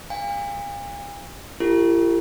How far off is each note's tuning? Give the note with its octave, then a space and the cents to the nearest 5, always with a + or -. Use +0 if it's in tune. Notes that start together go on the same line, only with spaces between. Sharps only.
F5 +10 G#5 -45
E4 +45 G4 +0 A#4 -40